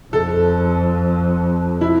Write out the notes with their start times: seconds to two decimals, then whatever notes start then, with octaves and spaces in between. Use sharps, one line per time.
0.13 F2 A4
1.81 E4